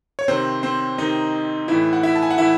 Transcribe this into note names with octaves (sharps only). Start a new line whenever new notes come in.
C#5
C3 D#3 C4 C5
C4 C5
C3 D#3 D#4 D#5
A2 E3 E4 E5
F#5
E4 E5
A5
G#5
F#5
A2 E3 E4 E5